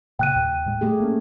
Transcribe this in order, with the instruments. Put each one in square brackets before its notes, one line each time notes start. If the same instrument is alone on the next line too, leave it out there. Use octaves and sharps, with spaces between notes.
[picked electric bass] A#2 C#3 [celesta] G5 F#6 D#7
[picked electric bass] D#2
A2 G#3
[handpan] A3 G4 G#4
[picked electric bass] A#3 C#4